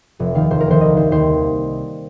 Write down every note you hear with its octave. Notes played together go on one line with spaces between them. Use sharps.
F1
D#2 D#3 F5
F1 C5
A#4
D#2 D#3 C5
C2 D#5
C3 D#3 C5
D#2 C5